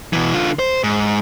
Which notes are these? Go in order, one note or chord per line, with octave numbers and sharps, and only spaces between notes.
B2 E3
D3 F4
C5
G#2